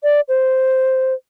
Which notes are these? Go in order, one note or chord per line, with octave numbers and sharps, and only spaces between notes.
D5
C5